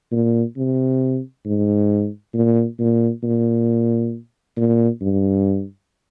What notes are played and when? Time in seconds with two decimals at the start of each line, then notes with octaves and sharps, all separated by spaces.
0.12 A#2
0.57 C3
1.46 G#2
2.34 A#2
2.79 A#2
3.23 A#2
4.57 A#2
5.02 G2